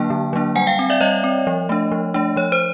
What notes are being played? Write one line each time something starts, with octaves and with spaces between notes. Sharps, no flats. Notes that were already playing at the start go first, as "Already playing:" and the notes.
Already playing: D3 F#3 A#3 D4 G5 A5
D3
F#3 A#3 D4
G3 F#5 G#5
F5 G5
C4
D5 E5
G3 C#5 D#5
C4
F3
A3 D4
F3
A3 D4
F3 C#5
C5